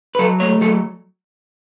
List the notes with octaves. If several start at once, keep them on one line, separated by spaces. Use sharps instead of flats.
B4
F#3 A4
A3 C#5
F#3 A4